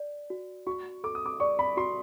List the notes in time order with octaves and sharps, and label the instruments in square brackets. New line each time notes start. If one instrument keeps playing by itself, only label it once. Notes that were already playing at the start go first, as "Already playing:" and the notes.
Already playing: [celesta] D5
F#4
[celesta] F#4 [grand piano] C#6
[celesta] A4 [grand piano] D6
[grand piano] D#6
D6
[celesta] D5 [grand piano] C#6
[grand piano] B5
[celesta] F#4 [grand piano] C6